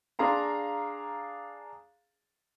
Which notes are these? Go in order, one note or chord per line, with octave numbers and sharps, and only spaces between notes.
D4 G#4 F5 A#5 C6